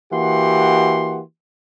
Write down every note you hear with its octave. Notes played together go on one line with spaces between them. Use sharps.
E3 A#3 F#4 G4 F#5 C6